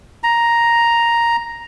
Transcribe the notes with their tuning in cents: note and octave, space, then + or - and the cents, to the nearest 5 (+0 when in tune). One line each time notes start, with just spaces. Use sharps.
A#5 +5